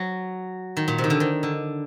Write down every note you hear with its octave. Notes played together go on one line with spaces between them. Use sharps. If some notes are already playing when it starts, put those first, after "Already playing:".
Already playing: F#3
D#3
A#2
C3
D#3
D3
D#3
D3